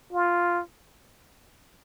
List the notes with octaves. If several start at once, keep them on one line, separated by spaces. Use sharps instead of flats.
F4